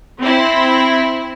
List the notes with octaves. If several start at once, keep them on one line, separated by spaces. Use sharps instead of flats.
C4 E4